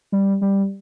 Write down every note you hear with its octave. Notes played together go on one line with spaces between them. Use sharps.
G3
G3